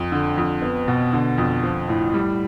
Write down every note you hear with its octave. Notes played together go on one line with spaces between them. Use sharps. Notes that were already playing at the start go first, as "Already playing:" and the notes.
Already playing: F2
D3
F2
B3
B2
D3
F2
F3
A2
G3